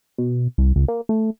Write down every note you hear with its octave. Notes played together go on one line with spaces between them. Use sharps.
B2
C2
C#2
A#3
A3